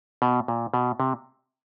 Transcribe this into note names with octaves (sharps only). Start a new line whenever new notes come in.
B2
A#2
B2
C3